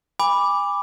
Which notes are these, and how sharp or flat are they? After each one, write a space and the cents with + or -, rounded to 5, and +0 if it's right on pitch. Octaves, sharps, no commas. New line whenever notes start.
G#5 -40 B5 +0 D6 +0